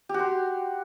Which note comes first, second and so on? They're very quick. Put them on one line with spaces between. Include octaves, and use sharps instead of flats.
G4 F#4 C6